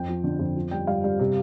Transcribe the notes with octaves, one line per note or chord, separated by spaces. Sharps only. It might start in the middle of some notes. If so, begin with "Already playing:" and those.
Already playing: F2 G5
F3
D3
F2
F3
G2 G5
G2 F5
G2
C3